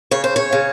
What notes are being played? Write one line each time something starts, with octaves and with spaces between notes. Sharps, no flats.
C#3 C#5
C5
C#5
C#3